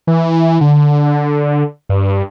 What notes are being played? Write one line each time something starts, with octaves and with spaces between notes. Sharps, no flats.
E3
D3
G2